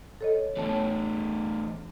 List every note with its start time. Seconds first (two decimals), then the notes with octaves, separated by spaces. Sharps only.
0.21 A4 C#5 D#5
0.57 E2 A2 C#5 A5